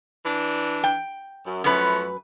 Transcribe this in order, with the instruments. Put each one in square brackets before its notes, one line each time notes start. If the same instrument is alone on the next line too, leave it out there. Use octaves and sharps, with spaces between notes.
[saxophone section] E3 D4
[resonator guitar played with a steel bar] G5
[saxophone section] F#2
[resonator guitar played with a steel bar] F#2 B4 [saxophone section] F3 A3 C#5